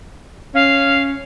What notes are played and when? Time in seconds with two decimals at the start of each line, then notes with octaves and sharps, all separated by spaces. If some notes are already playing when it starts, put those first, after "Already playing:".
0.55 C#4 F5